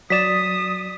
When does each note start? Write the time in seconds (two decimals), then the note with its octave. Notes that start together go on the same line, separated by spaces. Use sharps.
0.10 F#3 D5 D#6 A6 B6 E7